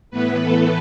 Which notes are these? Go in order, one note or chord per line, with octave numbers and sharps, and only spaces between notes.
A2 E3 B3 B4
A3 A4